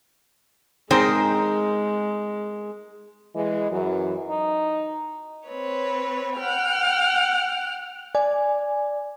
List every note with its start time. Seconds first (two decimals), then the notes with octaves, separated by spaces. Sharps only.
0.91 G#3 C4 D#4 G#4 A#4 C5 G5
3.35 E3 G#3 D#5
3.70 F#2 E3 F#3
4.29 D#4
5.47 C4 B4 C#5
6.36 F#5 G5 F6
8.15 D5 G#5